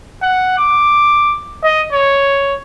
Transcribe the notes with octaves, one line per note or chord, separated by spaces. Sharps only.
F#5
D6
D#5
C#5